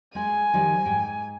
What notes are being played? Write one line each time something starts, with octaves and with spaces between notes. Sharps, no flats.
G#3 G#4 G#5
D#3 F3 G3
G#2 G5